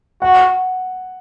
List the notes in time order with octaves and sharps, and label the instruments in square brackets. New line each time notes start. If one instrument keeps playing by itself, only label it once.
[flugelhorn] F#4 [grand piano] F#5